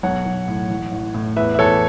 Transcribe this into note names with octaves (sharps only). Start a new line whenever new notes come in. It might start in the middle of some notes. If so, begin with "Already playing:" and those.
B1 C#5 F#5
B1
A2
A1
A1
A2
E2 B4 E5
E5
E2 A4 C#5